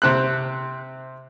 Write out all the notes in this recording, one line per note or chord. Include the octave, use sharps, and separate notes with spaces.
C3 C4 F#6